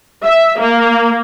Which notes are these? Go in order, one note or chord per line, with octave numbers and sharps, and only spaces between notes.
E5
A#3